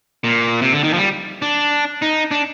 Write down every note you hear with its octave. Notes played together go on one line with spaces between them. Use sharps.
A#2
C3
D3
D#3
F3
G3
D4
D#4
D4